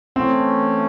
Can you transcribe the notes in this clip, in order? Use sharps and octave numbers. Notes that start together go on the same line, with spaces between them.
E3 A3 C4 C#4